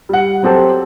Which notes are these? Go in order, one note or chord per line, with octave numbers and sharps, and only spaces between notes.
G3 F#5
F#3 C4 G4 A4